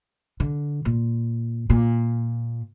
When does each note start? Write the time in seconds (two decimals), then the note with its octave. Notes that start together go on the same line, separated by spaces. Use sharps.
0.40 D3
0.85 A#2
1.70 A#2